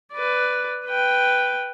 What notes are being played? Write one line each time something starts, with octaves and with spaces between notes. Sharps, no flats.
B4 D5
B4 G5